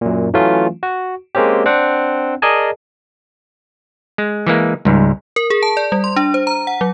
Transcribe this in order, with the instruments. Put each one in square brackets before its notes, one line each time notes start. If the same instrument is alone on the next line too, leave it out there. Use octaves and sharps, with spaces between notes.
[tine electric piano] F#2 A#2
E3 F#3 A3 C#4 F4
F#4
G#3 A#3 C4 C#4 G4
C4 D4 F#5
G#4 A#4 D5 D#5 G#5 A5
[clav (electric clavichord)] G#3
E3 G#3 A#3
[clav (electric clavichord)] C#2 G#2 [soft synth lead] G3
[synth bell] A#4
G#4
A5
D5
G3
C6
D4
C5
A#5
F#5
F#3